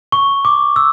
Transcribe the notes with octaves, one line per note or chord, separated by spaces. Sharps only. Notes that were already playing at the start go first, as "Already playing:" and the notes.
C#6
D6
E6